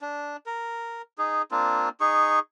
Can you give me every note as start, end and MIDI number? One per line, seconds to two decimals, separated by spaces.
0.01 0.36 62
0.46 1.02 70
1.18 1.42 63
1.18 1.42 68
1.51 1.89 58
1.51 1.89 60
1.51 1.89 62
1.51 1.89 65
2.00 2.39 63
2.00 2.39 68
2.00 2.39 85